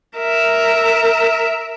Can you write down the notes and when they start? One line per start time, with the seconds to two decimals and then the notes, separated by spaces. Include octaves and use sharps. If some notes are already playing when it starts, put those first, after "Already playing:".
0.18 A#4 E5